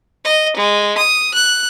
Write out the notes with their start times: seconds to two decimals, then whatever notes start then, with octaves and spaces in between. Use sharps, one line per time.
0.25 D#5
0.57 G#3
0.98 D#6
1.34 F#6